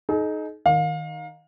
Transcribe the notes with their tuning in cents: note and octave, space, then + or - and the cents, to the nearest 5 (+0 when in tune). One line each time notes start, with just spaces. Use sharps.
D#4 +0 G#4 +45
D#3 +0 F5 +30